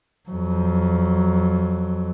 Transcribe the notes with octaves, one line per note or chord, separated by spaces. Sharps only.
F2 F#3